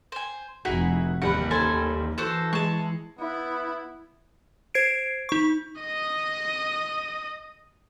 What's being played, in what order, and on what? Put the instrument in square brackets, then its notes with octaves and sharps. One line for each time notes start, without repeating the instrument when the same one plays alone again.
[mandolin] C5 G#5
[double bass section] F1 [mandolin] D#4 E4 G#4 [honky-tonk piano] F#4
[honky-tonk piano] A1 G3 B5 [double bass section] D#2 [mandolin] F#5
[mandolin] A4 C5 G#5
[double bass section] E3 [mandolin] F#4 A4 C5
[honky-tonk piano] G#3 [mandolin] A5 C#6
[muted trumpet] B3 [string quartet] E4
[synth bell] C5 G#6 C7 D7
D#4 C#6
[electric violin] D#5 D#6